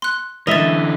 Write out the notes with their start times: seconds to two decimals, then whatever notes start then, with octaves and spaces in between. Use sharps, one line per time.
0.02 C6 F#6
0.47 D3 E3 D#5 E5 A6 F7